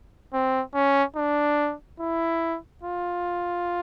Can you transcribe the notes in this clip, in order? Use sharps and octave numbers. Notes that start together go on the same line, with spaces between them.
C4
C#4
D4
E4
F4